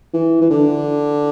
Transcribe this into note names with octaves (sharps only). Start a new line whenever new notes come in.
E3
E3
D3